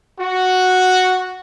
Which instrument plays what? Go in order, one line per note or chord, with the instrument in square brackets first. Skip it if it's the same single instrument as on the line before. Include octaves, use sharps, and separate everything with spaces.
[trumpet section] F#4